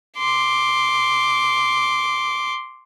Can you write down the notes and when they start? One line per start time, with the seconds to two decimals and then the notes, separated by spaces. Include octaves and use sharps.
0.18 C6 D6